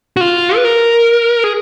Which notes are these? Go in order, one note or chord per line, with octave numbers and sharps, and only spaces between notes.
F#4
F4
B4
A#4
G#4